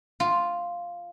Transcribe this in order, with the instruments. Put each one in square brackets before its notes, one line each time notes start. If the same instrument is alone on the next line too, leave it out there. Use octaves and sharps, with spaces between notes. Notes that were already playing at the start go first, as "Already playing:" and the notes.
[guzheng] F4